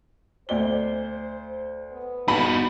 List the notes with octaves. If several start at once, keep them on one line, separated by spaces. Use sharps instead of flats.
D2 C5 D5 G7
B3
G1 E2 D#4 F#4 B5